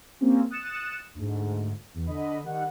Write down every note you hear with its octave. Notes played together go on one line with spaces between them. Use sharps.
A#3 C4 C#4 G4
D#6 F#6 A6 C#7 E7
D2 G#2
E2
D3 D#5 B5
D#3 G3 F#5